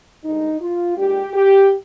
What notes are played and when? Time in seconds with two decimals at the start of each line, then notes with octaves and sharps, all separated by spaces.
0.24 G2 D3 G#3 D#4
0.61 F4
0.96 A#2 G#3 D4 G4
1.34 G4